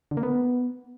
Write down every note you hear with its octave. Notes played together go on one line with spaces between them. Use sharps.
D3
A#3
B3